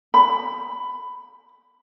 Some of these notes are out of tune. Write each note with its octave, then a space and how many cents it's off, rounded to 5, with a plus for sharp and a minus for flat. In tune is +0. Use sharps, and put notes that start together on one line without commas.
B5 +15